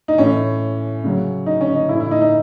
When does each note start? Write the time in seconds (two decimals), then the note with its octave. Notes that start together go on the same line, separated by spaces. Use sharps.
0.08 D#4
0.18 A2 E3 C#4
1.04 C#3 F#3
1.46 D#4
1.61 C#4
1.75 D#4
1.89 A2 E3 E4
2.00 E4
2.11 D#4
2.21 D#4